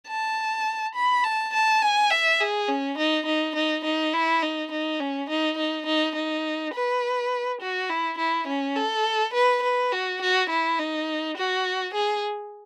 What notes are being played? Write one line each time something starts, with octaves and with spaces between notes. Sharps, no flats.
A5
B5
A5
A5
G#5
E5
G#4
C#4
D#4
D#4
D#4
D#4
E4
D#4
D#4
C#4
D#4
D#4
D#4
D#4
B4
F#4
E4
E4
C#4
A4
B4
B4
F#4
F#4
E4
D#4
F#4
G#4